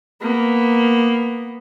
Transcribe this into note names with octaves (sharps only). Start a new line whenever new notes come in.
A#3 B3